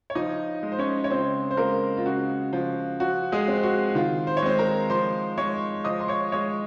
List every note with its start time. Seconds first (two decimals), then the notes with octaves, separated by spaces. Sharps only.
0.10 C#5
0.15 F3 D#4 D#5
0.63 G#3
0.72 C5
0.79 C#4 C#5
1.04 C#5
1.10 C#3 C4 C5
1.51 C5
1.57 G#3 A#3 A#4
1.97 F4
2.06 C#3 F#4
2.53 F3
3.00 F3 F#4
3.32 G#3 G#4
3.48 C4
3.63 F#4
3.95 D#3 F4
4.27 C5
4.37 C#5
4.42 G#3 C4 C5
4.59 A#4 A#5
4.90 F3 C5 C6
5.38 G#3 C#5 C#6
5.84 F3 D#5 D#6
6.00 C6
6.08 C#5 C#6
6.32 G#3 C#5 C#6